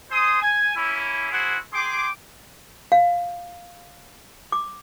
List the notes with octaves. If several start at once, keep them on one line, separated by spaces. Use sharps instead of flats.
C5 G#5 C6 D#6
G#5
A#3 C#4 E4
E4 F#4 G#4 C5 F#5
G#4 G5 C6 D6
F5
D6